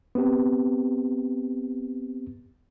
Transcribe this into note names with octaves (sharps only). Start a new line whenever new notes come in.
B3 C4 G4